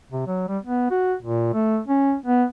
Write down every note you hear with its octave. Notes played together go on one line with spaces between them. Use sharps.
C3
F#3
G3
B3
F#4
A#2
A3
C#4
B3